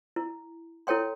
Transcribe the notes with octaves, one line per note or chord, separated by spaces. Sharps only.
E4
E4 A4 C#5 G5 C6